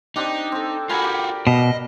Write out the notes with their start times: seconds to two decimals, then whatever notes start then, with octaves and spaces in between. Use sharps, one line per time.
0.16 C4 D4 D#4 G4
0.52 C4 A4
0.89 F4 F#4 A#4 G#5 B5
1.02 G4 G5
1.47 B2 D#5